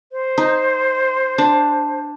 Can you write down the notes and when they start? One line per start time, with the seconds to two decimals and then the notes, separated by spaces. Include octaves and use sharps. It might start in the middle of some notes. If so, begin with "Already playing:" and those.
0.12 C5
0.38 D#4
1.38 D4